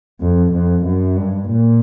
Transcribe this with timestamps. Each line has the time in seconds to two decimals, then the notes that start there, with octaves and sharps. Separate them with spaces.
0.21 F2
0.52 F2
0.85 F#2
1.17 G2
1.48 A#2